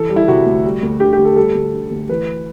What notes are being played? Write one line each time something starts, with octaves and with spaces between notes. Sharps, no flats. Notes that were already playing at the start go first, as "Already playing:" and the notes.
Already playing: E3 A4
G3
E4
C3 F#4
D2
G3
D2
D3 G4
G4
D2
A4
G3 A4
D2
D3
D2
E3 B4